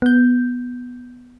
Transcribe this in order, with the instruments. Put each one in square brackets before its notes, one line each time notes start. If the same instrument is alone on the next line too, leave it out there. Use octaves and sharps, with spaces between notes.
[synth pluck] B3 G6